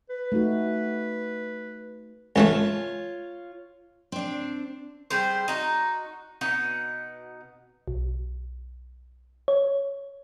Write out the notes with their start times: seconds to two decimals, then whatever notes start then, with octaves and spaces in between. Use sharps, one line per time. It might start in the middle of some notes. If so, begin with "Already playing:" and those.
0.09 B4
0.32 A3 D#4 F#4
2.36 C#2 E3 A3 F4 C#5
4.12 C4 D4
5.10 G3 G#4 C5
5.48 D#4 F#4
6.41 B2 D#4 F#5
7.88 B1
9.48 C#5